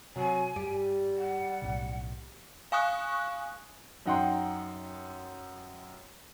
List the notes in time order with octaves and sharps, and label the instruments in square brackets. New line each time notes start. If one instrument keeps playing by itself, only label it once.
[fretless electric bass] C3 [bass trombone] F#3 [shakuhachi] G#5
[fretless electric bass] G2 [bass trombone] G3 [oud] G4
[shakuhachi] F#5
[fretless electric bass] B1 A2 C#3
[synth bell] F5 G#5 C#6 D#6 F#6
[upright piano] F#2 D#4 F#5 G5 C6